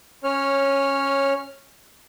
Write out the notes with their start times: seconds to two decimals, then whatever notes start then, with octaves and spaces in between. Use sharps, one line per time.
0.24 C#4 C#5 F6